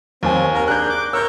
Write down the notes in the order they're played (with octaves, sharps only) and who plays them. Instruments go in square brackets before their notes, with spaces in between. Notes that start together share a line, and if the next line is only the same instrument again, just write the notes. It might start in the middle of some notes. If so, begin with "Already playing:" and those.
[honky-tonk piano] D#2 G#5 [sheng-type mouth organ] C4
[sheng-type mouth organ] A#4
[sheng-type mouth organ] D4 G#4 A#4 [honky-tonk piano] F#6 G6
[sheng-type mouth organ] D6
[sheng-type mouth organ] A#4 C#5 [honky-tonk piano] E6 G6